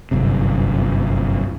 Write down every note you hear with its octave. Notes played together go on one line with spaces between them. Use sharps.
G1 C2 F#2 C3